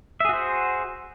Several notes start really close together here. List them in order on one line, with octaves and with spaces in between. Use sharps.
E5 G#4 F#4 C5